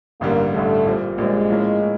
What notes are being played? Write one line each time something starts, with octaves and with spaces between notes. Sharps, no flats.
A1 G2 D3 G3 A#3
A1 G2 D3 G3 A3
A#1 A#2 G3 C4
A#1 A#2 G3 G#3 C4
A2 F3 A#3 C#4
A2